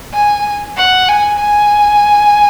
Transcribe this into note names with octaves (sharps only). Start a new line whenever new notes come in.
G#5
F#5
G#5
G#5